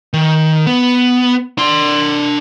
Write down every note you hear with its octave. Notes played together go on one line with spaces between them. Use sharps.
D#3
B3
D4 C6